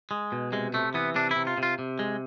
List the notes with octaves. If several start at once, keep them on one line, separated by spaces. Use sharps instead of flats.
G#3
B2
C3 G#3
C3 A3
E3 B3
C3 D4
E4
C3
F4
C3
F4
C3
G#3